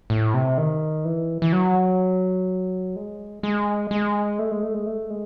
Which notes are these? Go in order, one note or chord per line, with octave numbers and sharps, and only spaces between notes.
A2
C3
D#3
E3
E3
F#3
G#3
G#3
G#3
A3
G#3
A3
G#3
A3
G#3